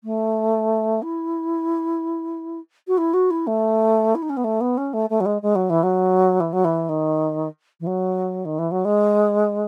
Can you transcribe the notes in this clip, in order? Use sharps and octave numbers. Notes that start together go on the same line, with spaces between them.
A3
E4
F#4
E4
F#4
E4
A3
E4
D#4
C#4
B3
A3
B3
C#4
A3
A3
F#3
G#3
G#3
F#3
E3
F#3
E3
F#3
E3
D#3
E3
F#3
D#3
E3
F#3
G#3